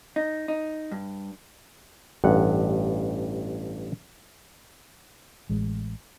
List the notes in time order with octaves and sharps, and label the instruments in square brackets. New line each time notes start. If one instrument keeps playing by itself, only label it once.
[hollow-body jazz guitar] D#4
D#4
G2
[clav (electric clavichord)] A1 G2 F#5
[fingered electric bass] A1 G#3